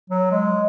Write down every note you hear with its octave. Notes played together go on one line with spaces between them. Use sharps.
F#3
G#3